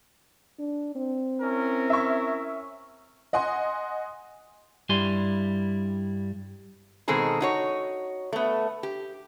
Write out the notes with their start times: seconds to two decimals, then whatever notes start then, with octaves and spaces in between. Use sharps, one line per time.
0.59 D4
0.95 C4
1.42 C#4 E4 A#4
1.90 E5 C#6
3.33 D#5 F#5 G#5 C6
4.89 G2 G3 E4 G#5 C6
7.08 B2 D#3 G#3 C4 G#4 A4
7.41 D#4 F#4 C#5
8.33 A3 B3
8.83 G4